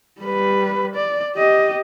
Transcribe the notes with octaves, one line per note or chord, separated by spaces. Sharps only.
G3 B4
D5
G4 D#5